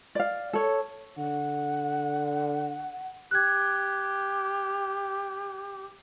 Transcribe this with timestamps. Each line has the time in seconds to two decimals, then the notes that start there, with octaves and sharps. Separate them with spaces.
0.15 D5 F5
0.53 A4 C#5
1.18 D3 F#5
3.31 G4 F#6 G#6